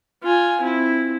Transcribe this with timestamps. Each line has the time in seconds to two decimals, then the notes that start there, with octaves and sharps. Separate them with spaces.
0.23 F4 G#5
0.61 C4 E4